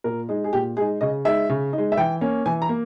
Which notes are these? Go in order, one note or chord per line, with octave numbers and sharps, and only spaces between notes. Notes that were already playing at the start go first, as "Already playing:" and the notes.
A#2 A#4
G#3 D#4
G#4
A#2 G4
G#3 D#4 G#4
C#3 D#5
G#3 D#4 E5
C#3
D#4
G#3
E5
E3 G5
A#3 C#4
E3 G#5
A#5
A#3